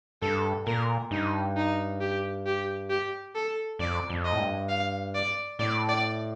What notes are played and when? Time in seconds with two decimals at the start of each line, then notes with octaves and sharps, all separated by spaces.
0.22 G2 A4
0.66 A#2 A#4
1.11 G2 D#4
1.57 D#4
2.01 G4
2.46 G4
2.90 G4
3.35 A4
3.79 F2 D5
4.10 F2
4.24 D#5
4.33 A2
4.39 G2
4.69 F5
5.15 D5
5.59 A2 D5
5.89 D5